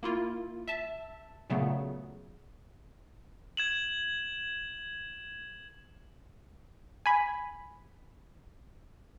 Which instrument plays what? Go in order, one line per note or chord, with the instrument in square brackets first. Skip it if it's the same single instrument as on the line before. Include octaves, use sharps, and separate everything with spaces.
[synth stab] A#3 E4 F4
E5 A5
A#2 C#3 F#3 A3 B3
[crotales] G#6 E7 F#7
[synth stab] G#5 B5